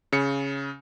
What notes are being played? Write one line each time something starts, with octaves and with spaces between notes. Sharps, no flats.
C#3 C#7